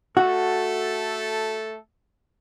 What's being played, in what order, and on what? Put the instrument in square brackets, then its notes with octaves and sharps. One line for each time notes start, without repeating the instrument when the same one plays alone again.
[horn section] A3 A4 [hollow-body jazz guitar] F#4